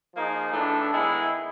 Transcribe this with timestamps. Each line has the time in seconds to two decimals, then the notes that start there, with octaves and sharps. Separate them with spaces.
0.14 F3 A#3 D#4 G#4
0.53 A2 E3 A3 D4
0.92 D#3 G#3 B3 E4 G#4